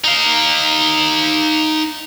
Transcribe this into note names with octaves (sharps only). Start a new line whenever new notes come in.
D#4 F5